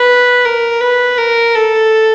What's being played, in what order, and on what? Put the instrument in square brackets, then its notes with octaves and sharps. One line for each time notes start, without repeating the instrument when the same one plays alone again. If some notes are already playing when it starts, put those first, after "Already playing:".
Already playing: [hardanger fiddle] B4
A#4
B4
A#4
A4